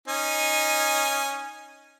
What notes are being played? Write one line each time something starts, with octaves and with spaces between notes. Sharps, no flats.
C#4 D#4 G#5